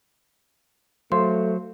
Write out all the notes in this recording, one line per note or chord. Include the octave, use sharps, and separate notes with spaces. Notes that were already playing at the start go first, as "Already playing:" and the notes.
F#3 A3 C5 F5 C6